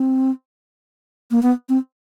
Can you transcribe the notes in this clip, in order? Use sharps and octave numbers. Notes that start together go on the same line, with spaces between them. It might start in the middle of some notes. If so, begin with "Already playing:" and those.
Already playing: C4
A#3
B3
C4